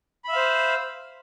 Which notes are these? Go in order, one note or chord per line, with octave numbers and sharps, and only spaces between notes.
C5 E5 F5 B5